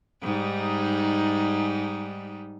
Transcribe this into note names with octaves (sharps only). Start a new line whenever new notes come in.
G#2 G3 D#4